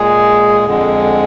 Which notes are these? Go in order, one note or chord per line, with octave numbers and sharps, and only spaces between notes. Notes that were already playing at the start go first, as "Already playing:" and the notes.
Already playing: A#2 G#3 G#4
F2 D3 G#3